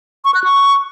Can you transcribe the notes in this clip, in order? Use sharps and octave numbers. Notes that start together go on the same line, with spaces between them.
C#6
F#6
C#6